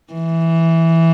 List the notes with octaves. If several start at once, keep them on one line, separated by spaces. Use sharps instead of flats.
E3